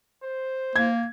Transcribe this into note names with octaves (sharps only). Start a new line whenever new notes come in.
C5
A#3 G#6